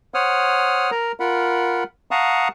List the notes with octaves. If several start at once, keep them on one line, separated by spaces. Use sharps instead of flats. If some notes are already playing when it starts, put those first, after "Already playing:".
C5 C#5 F#5 D#6 F6
A#4 A#5
F4 A#4 F#5 B5
F5 F#5 A5 A#5 C#6 D#6